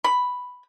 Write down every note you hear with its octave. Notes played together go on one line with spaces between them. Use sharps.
B5